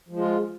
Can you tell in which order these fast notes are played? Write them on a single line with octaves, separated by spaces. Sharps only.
F3 G#3 F4